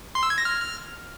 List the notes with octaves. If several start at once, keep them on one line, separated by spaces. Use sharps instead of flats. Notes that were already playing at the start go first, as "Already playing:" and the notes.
C6
E6
G#6
A#6
F6